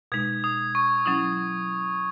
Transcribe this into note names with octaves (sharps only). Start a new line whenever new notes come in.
B2 G#3 D#4 G#6
D#6
C#6
F#3 C#4 E4 D#6